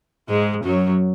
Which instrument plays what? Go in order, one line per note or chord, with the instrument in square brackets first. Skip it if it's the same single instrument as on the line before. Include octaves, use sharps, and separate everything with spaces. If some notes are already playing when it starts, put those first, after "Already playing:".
[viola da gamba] G#2 G#3
F#2 F#3